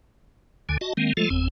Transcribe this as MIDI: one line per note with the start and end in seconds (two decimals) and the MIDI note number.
0.69 0.77 38
0.69 0.77 50
0.69 0.77 80
0.81 0.93 66
0.81 0.93 75
0.81 0.93 81
0.97 1.13 51
0.97 1.13 56
0.97 1.13 58
0.97 1.13 60
1.17 1.29 53
1.17 1.29 56
1.17 1.29 57
1.17 1.29 65
1.17 1.29 69
1.30 1.48 30
1.30 1.48 40
1.30 1.48 60
1.30 1.48 80